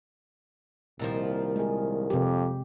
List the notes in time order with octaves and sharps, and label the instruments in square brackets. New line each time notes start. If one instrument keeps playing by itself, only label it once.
[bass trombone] C2 [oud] A#2 D#3 F3
[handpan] G#3 G#4
[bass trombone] F2 [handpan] C3 G4